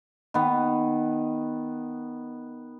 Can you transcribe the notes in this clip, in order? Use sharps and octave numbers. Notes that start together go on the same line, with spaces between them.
D#3 B3